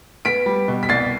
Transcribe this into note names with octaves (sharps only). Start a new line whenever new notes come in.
B3 B6 D7
G3
B2
B6
C2 A6 C7